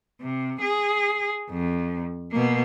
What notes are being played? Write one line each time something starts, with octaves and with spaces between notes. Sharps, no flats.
C3
G#4
F2
B2 A#3